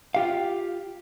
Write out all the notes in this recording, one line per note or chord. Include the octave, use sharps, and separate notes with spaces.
F4 G4 F5